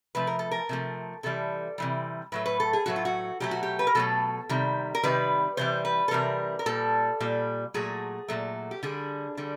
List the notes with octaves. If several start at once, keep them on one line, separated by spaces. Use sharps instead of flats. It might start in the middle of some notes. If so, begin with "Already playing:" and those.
C3 F3 A3 B4
A#4
A4
A#4
C3 F3 A3
C3 E3 G3 A4
C3 E3 G3
A2 F#3 A3 B4
B4
A4
G#4
A2 F#3 A3 F#4
F4
F#4
B2 F#3 A3 G4
F#4
G4
B4
A#4
B2 F#3 A3 A4
C3 D#3 G3
A#4
C3 D#3 G3 B4
C3 E3 G3 C5
B4
A4
C3 E3 G3 A#4
A#4
A#2 G3 A4
A#2 G3
A#2 F#3 A3 G#4
A#2 F#3 A3
G4
D3 G3 G#4
D3 G3